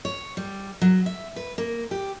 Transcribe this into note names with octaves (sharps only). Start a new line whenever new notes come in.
C#5
G3
F#3
E5
B4
A#3
G4